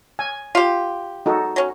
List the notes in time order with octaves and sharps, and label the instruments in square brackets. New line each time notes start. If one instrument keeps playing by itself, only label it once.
[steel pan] G#5
[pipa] F4 G4
[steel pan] D#4 F#4 A4
[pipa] F#3 C#4